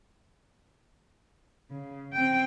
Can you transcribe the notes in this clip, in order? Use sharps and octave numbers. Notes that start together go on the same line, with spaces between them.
C#3
C4 G5